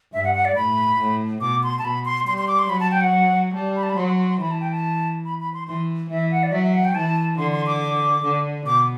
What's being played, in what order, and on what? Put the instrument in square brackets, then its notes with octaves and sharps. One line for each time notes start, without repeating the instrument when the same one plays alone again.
[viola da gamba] G2 [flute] E5
[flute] F#5
F#5
D5
[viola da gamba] A2 [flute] B5
[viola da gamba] A2
[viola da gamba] B2 [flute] D6
[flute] C6
A5
[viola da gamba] B2 [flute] B5
[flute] C6
[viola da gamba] G3 [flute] C6
[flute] C6
D6
C6
[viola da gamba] F#3 [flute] B5
[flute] A5
G5
F#5
[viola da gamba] G3 [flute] A5
[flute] B5
A5
B5
[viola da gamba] F#3 [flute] C6
[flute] C6
C6
C6
[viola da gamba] E3 [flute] B5
[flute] A5
G5
A5
B5
B5
C6
[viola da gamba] E3 [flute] C6
[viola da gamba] E3 [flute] E5
[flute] F#5
D5
[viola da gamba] F#3 [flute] E5
[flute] E5
F#5
G5
[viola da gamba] E3 [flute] A5
[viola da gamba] D3 [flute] C6
[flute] C6
D6
[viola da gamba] D3
[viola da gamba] B2 [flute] D6